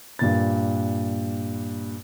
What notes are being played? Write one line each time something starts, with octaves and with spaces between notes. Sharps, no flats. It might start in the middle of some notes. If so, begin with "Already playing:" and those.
G2 A#2 A6